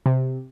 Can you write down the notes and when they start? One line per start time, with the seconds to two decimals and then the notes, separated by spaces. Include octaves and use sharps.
0.06 C3